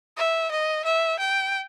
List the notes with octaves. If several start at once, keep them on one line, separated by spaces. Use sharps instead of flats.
E5
D#5
E5
G5